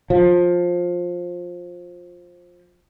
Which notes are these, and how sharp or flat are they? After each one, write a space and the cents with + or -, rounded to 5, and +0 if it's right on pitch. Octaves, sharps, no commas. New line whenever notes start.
F3 +15